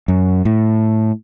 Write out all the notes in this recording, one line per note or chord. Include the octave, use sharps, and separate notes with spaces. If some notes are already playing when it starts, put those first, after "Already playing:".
F#2
A2